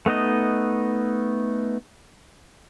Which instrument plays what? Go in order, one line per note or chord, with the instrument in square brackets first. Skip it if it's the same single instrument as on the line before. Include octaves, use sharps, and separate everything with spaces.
[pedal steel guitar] A3 B3 D#4 D#5